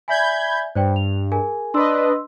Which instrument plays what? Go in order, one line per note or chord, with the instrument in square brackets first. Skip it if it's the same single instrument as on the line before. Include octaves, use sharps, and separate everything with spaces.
[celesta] D5 E5 G#5 [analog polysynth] B5 G6 G#6
[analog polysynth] G2 [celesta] C5 D5 G5
[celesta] F7
G#4 A#4 G#5
[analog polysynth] D4 B4 D#5 [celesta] C6 E6